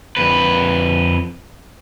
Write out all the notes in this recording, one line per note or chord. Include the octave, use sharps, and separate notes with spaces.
F2 B4